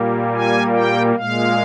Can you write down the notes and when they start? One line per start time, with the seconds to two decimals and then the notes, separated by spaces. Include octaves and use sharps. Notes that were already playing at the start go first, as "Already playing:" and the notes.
Already playing: A#2 G3 A#3
0.35 G#5
0.74 G5
1.15 A#2 G#3 F5